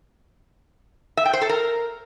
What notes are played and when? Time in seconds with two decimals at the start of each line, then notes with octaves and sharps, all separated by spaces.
1.17 E5
1.25 G5
1.33 C5
1.41 A4
1.49 A#4